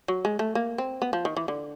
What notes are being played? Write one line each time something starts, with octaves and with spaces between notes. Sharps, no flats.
F#3
G#3
A3
A#3
C4
B3
F3
D#3
E3
D3